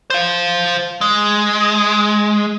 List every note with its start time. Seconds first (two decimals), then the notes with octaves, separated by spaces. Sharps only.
0.10 C5 F5
1.01 G#3